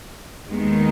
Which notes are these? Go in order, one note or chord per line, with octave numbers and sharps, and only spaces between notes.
D#2 D#3 G#3 B3 D#4